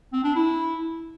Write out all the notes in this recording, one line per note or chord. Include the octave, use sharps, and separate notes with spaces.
C4
D4
E4